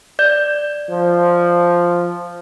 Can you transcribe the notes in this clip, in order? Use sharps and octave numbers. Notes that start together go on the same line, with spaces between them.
D5 G6
F3